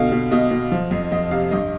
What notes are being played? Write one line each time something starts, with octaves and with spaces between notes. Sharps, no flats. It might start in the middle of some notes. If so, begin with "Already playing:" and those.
Already playing: B2 D3 F5
B2
B2 D#5
B2
F3
F2
F2 D#5
C3 F5
G2 D#5